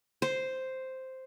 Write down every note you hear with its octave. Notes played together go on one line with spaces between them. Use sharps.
C5